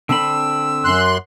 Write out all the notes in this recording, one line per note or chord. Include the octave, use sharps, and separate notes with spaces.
D3 C4 B5 E6
F#2 C6 F#6